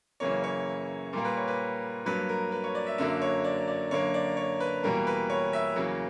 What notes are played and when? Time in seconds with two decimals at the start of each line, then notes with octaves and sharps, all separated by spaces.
0.20 F#2 C#3 E3 A#3 C#5
0.44 C#5
1.13 A#2 G3 A#3 A#4
1.25 B4
1.37 C#5
1.48 B4
2.05 G2 F#3 A#3 B4
2.29 A#4
2.52 B4
2.64 C#5
2.75 D5
2.87 E5
2.98 F#2 D3 F#3 A#3 E5
3.22 C#5
3.44 D5
3.68 D5
3.91 F#2 D3 A#3 C#5
4.14 D5
4.37 C#5
4.60 B4
4.83 E2 B2 G3 A#3 A#4
5.07 B4
5.30 C#5
5.53 E5
5.76 E2 C#3 F#3 A#3